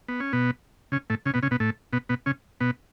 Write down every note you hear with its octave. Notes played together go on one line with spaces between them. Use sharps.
B3
C#4
B2 B3
C#3 C#4
A2 A3
C#3 C#4
B2 B3
C#3 C#4
B2 B3
A2 A3
B2 B3
B2 B3
C#3 C#4
B2 B3